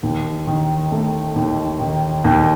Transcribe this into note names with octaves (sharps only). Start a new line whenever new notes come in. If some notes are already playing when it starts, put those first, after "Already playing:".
D#2
D#3
A3
D#2
D#3
D#2